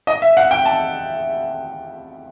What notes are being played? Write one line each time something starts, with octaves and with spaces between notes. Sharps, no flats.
D#5
E5
F#5
G5
A5